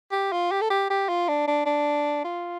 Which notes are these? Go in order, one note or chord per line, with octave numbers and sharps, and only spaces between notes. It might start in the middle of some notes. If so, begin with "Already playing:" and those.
G4
F4
G4
A4
G4
G4
F4
D4
D4
D4
F4